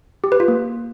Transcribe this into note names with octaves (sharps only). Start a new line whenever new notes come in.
G4
B4
F4
A#3